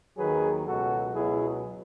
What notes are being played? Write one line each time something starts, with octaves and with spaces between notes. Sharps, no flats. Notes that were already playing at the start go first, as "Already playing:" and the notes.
D#2 D#3 F#3 G#4 B4
C#2 B2 F#3 F#4 A4
C#2 B2 F#3 E4 G#4